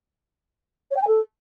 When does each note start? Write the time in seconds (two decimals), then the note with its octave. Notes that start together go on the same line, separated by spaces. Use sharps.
0.91 C#5
0.96 G5
1.02 G#5
1.07 A4